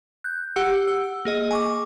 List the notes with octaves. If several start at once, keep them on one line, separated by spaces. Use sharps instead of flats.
F#6 G6
G4 F#5 E6 C#7
E6
A#3 G#4 D#5
G#5 C#6 D6